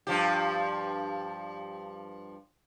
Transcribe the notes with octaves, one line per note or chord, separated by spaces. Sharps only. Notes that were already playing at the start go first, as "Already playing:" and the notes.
G2 F3 G4